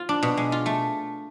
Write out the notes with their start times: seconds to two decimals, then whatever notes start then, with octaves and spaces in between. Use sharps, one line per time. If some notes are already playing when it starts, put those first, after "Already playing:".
Already playing: F4
0.09 D4
0.23 B2
0.37 G#3
0.52 F4
0.66 A3